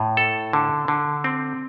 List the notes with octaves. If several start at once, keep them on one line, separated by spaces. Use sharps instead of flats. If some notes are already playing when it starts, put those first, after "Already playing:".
Already playing: A2
A4
D3
D3
C4